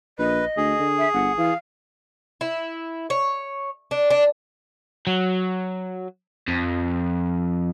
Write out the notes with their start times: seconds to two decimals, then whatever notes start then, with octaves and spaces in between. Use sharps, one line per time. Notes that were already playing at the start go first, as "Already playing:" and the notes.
0.19 A#1 B4 D#5
0.57 D2 G#4
0.79 D3
0.98 E5
1.14 G1 F#5
1.38 E3 F5
2.41 E4
3.10 C#5
3.91 D4
4.10 D4
5.07 F#3
6.48 F2